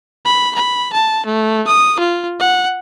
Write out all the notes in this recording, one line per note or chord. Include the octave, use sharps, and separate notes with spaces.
B5
B5
A5
A3
D#6
F4
F#5